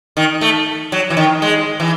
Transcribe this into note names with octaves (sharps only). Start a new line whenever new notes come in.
D#3
A3
F#3
E3
D#3
G#3
E3